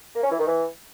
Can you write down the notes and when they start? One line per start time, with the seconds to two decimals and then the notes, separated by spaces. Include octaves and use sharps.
0.15 A#3
0.23 C#4
0.31 E3
0.39 D#3
0.47 E3